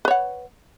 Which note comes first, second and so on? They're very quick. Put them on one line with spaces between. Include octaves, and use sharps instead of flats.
B4 C#5 F#5